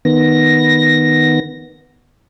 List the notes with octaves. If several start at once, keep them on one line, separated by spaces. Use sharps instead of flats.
D#3 B3 A#6